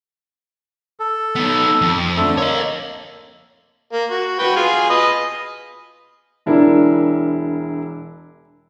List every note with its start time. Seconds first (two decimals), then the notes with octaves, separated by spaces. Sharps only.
1.00 A4
1.35 B3 D#4
1.82 F2
2.17 D3 A3 A4
2.38 A#3 C#5 D#5
3.93 A#3
4.11 F#4
4.39 F#4 B4 G5
4.56 F4 G#4 G#5
4.89 B4 D#5
6.46 E1 D4 E4 A#4